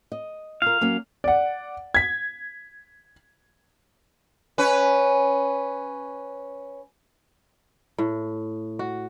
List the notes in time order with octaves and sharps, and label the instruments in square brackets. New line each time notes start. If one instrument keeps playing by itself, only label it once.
[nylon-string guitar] D#5
[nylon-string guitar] F4 A#4 [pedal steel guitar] F5
[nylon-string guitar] F#3 A#3 C#4
[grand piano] D5 F#5
G#6 B6
[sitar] C#4 B4
[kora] A2
F#4